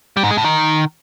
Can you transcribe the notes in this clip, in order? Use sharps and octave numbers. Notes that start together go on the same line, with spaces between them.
G3
G#2
G#3
A2
D#3